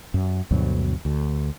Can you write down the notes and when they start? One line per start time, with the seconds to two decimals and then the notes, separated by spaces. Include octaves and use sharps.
0.14 F#2
0.51 D2 G2 B2 F#3
1.05 D2